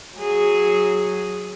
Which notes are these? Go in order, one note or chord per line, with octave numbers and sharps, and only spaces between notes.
F#3 G#4